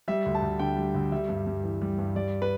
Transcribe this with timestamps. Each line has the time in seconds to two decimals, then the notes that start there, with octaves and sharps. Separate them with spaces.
0.08 G3 E5
0.26 D2
0.35 A5
0.42 D2
0.59 D3 G5
0.77 G3
0.95 D2
1.12 G3 E5
1.29 G2
1.46 G2
1.63 E3
1.82 G3
1.98 G2
2.15 G3 D5
2.42 B4